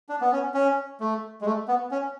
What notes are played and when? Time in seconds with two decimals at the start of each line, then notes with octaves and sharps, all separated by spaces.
0.09 D4
0.21 B3
0.32 C#4
0.54 C#4
1.00 A3
1.41 G#3
1.46 A3
1.68 B3
1.91 C#4